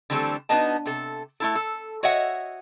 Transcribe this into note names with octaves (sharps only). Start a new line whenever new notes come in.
D3 E3 G3 A3 C4 A4
B3 D4 D#4 F#4 D#5 A5
C3 A4
A3 E4 A4
A4
F#4 C#5 D#5 E5 F#5